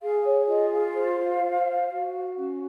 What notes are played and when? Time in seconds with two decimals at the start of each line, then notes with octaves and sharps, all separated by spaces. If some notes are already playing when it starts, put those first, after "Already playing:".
0.01 G#4 F5
0.25 C#5
0.48 F4 D#5
0.72 F5
0.95 C5
1.42 C5
1.90 F#4
2.37 C#4